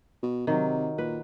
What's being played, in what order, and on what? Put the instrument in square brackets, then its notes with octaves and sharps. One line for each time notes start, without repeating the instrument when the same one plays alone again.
[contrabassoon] B2
[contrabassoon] C3 [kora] D#3 F#3
[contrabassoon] A#2 [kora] B4